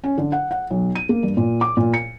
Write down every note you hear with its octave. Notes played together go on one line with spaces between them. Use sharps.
C#4
D3
F#5
F#5
B1
D#7
A#3
G2
A#2
D6
A#2
C#7